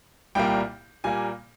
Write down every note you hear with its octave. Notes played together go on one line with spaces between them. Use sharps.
C2 A#2 G3 A#3 G5
A#2 G3 A#3 G#5